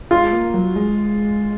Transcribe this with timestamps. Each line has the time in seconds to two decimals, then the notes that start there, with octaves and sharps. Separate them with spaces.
0.11 G#3 F4
0.33 A#3
0.54 F#3
0.76 G#3